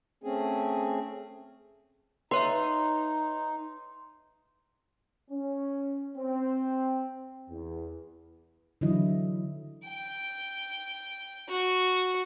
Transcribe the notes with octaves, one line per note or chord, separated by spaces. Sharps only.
A3 C4 C#4 G#4
D#4 B4 C#5 E5 C6
C#4
C4
E2
D3 E3 F#3 E4 D#5
G5
F#4